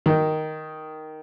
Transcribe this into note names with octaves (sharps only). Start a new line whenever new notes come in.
D#3